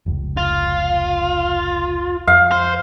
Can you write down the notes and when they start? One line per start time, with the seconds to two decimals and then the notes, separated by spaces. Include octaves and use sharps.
0.06 F1 C#2
0.37 F4
2.27 F2 F5
2.51 C5